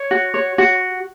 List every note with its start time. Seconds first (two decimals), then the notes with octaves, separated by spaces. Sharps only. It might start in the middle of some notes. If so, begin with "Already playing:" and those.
Already playing: C#5
0.11 F#4
0.34 C#5
0.58 F#4